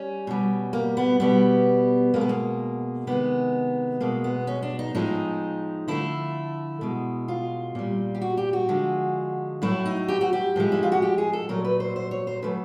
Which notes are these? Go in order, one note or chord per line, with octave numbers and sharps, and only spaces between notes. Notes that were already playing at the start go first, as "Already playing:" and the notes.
Already playing: G3 C#4
B2 G3
A#3
B3
B2 G3 B3
B2 G#3 A#3
B3
A#3
C3 D#3 G#3 B3
B2 G#3 A#3
B3
C#4
D4
D#4
A2 F3 G#3 D#4
D3 F3 A3 E4
B2 G#3
F4
A#2 G3
G4
F#4
G4
F#4
D3 F3 G#3
A2 F#3 A3 E4
D#4
G4
F#4
G4
A2 F3 G#3
E4
F4
F#4
G4
G#4
A4
A#2 F#3 A3 A#4
B4
C5
C5
C#5
C5
C#3 F#3 A3 B4